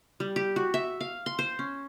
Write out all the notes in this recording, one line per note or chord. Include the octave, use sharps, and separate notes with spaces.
G3
G4
F#4
E5
F5
C6
C5
C#4